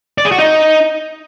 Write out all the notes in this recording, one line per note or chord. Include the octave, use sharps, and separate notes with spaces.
D5
G#4
F#4
D#4